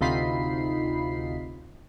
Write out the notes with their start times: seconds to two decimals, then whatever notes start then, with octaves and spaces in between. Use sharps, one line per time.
0.01 D2 C3 D#4 F4 B5 C7